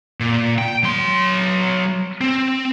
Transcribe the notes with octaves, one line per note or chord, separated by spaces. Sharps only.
A#2
G5
F#3 C6
C4